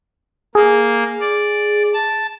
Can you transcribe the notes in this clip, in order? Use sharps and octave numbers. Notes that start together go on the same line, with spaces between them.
A#3 G#4
D5
A5